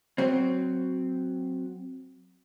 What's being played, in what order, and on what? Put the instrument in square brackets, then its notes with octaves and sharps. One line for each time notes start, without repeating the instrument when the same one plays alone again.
[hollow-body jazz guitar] F#3 C4